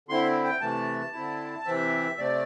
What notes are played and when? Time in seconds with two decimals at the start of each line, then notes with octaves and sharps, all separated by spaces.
0.09 D3 C4 E4 C6
0.44 G5
0.61 C3 E3 A3 A5
1.13 D3 C4 E4
1.65 C3 E3 C4 E5
2.17 C3 A3 C4 D5